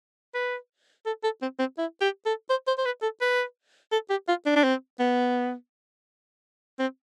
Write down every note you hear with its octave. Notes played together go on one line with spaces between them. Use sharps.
B4
A4
A4
C4
C4
E4
G4
A4
C5
C5
C5
B4
A4
B4
A4
G4
F4
D4
D4
C4
B3
C4